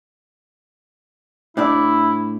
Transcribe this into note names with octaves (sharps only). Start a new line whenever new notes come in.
A2 D4 E4 D5